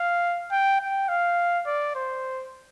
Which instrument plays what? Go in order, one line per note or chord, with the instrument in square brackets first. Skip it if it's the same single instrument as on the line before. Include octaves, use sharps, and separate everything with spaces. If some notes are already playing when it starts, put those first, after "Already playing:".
Already playing: [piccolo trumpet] F5
G5
G5
F5
D5
C5